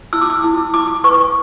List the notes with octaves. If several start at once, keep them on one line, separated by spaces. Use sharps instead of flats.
E4 E6
D6
E6
E4
E4 D6
B4 C#6